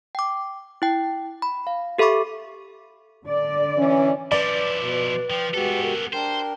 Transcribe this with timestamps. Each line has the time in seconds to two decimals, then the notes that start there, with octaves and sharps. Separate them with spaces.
0.15 G5 D6
0.82 E4 G5
1.42 B5
1.67 F5
1.98 G4 A4 E5 B5 C#6 D6
3.25 D3 D5
3.78 E3 C#4
4.32 F3 E4 B4 D5
4.79 B2
5.30 F3 G5
5.54 G#3 B3 F#4 G4 A4
5.83 A#4
6.13 D4 A#4 C5 G5